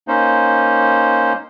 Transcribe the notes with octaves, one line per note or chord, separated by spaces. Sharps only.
A#3 C#4 D#4 C5